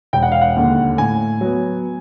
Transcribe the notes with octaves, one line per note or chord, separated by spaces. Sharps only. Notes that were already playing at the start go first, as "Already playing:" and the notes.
E1 G5
F#5
F5
F#5
D#2 D3
A2 G#5
F#3 B3